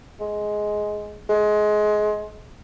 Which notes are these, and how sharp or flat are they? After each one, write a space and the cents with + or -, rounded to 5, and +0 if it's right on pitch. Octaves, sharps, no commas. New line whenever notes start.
G#3 +10
G#3 +20